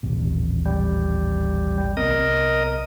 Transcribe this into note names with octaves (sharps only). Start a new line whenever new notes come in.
D#1 A1 C3
G3
C2 B3 C4 A#4 D#5